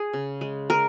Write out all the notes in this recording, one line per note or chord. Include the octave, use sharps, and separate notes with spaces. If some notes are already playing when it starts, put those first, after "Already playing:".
Already playing: G#4
C#3
G#3
G#3 A#4